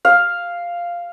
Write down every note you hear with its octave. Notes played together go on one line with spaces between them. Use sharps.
F5